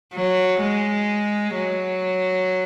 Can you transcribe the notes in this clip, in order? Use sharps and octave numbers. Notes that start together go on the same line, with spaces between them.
F#3
G#3
F#3